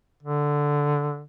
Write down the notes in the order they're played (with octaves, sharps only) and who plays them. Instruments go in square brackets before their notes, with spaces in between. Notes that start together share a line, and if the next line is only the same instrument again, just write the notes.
[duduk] D3